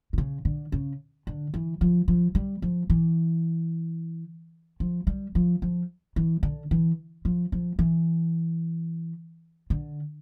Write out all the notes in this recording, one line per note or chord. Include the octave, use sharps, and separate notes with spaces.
A#2
C#3
D3
C#3
D3
E3
F3
F3
G3
F3
E3
F3
G3
F3
F3
E3
D3
E3
F3
F3
E3
D3